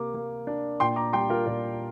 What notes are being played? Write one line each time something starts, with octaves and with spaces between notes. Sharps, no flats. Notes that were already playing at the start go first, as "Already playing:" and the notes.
Already playing: C3 A#3 D6
A#3
D4
A#2 G5 C6
A#5 D6
G3 G5 C6
F4 A#4
A#2 A#4 D5